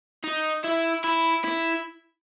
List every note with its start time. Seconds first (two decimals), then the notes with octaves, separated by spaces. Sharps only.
0.24 D#4
0.64 E4
1.04 E4
1.44 E4